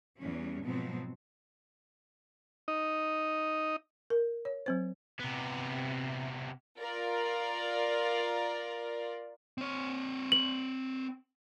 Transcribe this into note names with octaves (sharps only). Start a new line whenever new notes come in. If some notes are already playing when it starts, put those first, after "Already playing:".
E2 G3 C#4
G#2 B2 F3 F#3 B3 C4
D#4 D#5
A#4
C#5
F#3 C4 C5
C3 B3
F4 A#4 D5
C4 C#5
F#7